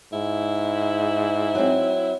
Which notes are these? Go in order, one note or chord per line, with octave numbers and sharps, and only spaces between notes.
G#2 E4
F#3 C4